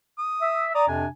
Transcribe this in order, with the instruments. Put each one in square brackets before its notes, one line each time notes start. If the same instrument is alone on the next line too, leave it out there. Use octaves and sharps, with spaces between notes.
[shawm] D#6
[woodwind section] E5
[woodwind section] D5 A#5 [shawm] D#6
[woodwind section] F2 C3 D4 [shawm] G#5